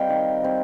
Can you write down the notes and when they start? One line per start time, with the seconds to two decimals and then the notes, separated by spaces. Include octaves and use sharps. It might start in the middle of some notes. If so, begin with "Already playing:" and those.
Already playing: G3 C4 D#5 F5 G5
0.09 D#3
0.42 G3 C4